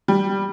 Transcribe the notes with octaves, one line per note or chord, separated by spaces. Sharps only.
G3